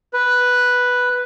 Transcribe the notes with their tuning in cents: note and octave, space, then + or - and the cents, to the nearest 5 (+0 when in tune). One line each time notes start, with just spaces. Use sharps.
B4 +0